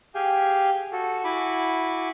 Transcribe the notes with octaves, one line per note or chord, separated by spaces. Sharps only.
G4 G#4 F5 G5 G#5
F#4 A4
E4 F#4 G#5 B5 D6